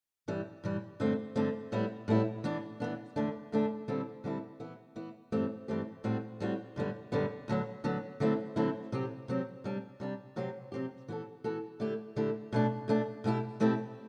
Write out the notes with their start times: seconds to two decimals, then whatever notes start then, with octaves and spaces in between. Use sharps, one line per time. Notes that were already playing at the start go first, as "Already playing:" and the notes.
0.28 G2 E3 G3
0.64 G2 E3 G3
1.00 G2 D3 A3 C4
1.36 G2 D3 A3 C4
1.72 A2 G3 B3 E4
2.08 A2 G3 B3 E4
2.44 E3 B3 D4
2.80 E3 B3 D4
3.16 E2 D3 A3 D4
3.52 E2 D3 A3 D4
3.88 D3 G3 C4 E4 A4
4.24 D3 G3 C4 E4 A4
4.60 E3 B3 E4
4.96 E3 B3 E4
5.32 G2 E3 A3 C4 G4
5.68 G2 E3 A3 C4 G4
6.04 A2 G3 C4 F#4
6.40 A2 G3 C4 F#4
6.76 F#2 D3 G3 B3
7.12 F#2 D3 G3 B3
7.48 D2 D3 F#3 B3
7.84 D2 D3 F#3 B3
8.20 D3 F#3 A3 C4 E4
8.56 D3 F#3 A3 C4 E4
8.92 C3 F#3 C4 G4
9.28 C3 F#3 C4 G4
9.64 C3 G3 D4
10.00 C3 G3 D4
10.36 C3 F#3 C4 G4
10.72 C3 F#3 C4 G4
11.08 E3 B3 F#4 A4
11.44 E3 B3 F#4 A4
11.80 D3 A3 E4 G4
12.16 D3 A3 E4 G4
12.52 B2 A3 D4
12.88 B2 A3 D4
13.24 B2 A3 C4 E4 G4
13.60 B2 A3 C4 E4 G4